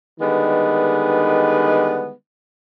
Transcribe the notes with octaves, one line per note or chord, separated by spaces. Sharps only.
D3 D#3 G3 G#3 B3 B4